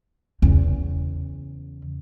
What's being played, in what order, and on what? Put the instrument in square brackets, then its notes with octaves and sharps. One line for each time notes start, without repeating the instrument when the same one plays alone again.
[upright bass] E2 C#3